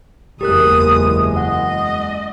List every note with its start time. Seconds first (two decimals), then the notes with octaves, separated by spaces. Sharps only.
0.41 F#1 E2 G#3 G4 A#4 D#6 F#6
1.36 D#5 F#5